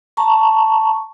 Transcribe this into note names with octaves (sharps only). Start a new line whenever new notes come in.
A5 A#5 C#6